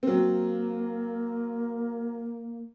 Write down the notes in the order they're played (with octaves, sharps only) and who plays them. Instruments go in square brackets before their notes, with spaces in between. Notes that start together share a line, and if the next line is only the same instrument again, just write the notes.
[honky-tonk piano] F#3 C4 [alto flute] A#3